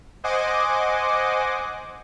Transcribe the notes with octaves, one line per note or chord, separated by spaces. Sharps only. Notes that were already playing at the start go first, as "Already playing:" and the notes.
C5 D#5 F#5 G#5 D6